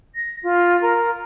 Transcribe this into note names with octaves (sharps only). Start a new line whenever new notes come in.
A#6
F4
A#4